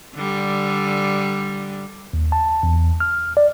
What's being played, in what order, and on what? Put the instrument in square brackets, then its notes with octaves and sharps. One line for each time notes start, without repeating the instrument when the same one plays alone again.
[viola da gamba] D3 G3
[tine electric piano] D#2
A5
E2
F6
D5